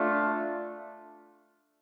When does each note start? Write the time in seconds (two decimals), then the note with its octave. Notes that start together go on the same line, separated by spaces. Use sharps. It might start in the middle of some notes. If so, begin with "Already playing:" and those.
Already playing: A3 D4 F4